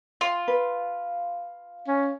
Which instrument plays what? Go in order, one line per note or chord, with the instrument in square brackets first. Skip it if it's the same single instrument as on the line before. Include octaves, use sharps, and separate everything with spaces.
[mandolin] F4
[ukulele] B4
[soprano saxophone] C#4